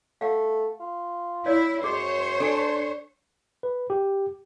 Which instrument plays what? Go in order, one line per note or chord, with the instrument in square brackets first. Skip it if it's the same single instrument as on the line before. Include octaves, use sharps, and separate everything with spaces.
[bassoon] A3 [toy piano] F5 F#5
[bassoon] F4
[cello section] E4 [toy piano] C#5 D5
[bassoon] F#2 [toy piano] G#4 D#5 [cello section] C5 C#5
[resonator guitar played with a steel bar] D4 [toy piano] A4 G#5
[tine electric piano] B4
G4